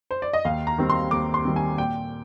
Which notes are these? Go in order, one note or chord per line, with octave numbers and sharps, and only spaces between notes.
C5
D5
D#5
D#2 F5
A#5
D#3 G3 C4
C6
D#2 D6
C6
D#3 G3 C4
G#5
A#2 G5